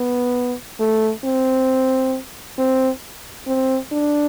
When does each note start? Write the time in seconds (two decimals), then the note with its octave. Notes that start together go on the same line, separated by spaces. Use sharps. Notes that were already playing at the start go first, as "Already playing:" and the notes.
Already playing: B3
0.80 A3
1.24 C4
2.58 C4
3.47 C4
3.92 D4